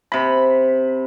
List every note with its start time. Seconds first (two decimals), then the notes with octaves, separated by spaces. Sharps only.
0.12 C3 B5